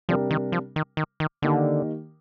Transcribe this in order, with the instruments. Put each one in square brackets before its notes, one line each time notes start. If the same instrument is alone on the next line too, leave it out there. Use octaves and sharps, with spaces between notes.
[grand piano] C3 G3 D4 G4 A#4 [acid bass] F3
[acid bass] D#3
F3
D#3
D#3
D#3
[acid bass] D3 [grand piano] D#3 A#3 D#4 G4 A#4